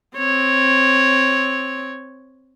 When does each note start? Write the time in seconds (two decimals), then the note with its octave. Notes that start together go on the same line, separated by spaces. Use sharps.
0.18 C4 C#5